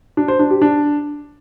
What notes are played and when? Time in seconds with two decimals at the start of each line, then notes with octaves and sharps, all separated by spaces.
0.17 D4
0.28 C5
0.39 D4
0.50 G4
0.62 D4